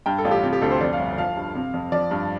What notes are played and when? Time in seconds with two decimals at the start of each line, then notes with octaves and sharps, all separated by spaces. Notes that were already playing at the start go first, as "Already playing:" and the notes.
0.06 G2 G5
0.18 A4
0.25 A1 F4
0.31 G4
0.43 C3 F4
0.53 G4
0.62 D2 A4
0.71 C5
0.81 F2 D5
0.93 F5
0.99 G1
1.18 F3 F5
1.36 G2
1.55 C3
1.74 F2
1.92 F3 D5
2.11 G2